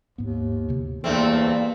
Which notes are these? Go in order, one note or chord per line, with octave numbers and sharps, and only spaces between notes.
D#2 G#2 B3
D2 C3
E2 G2 A3 A#3 C4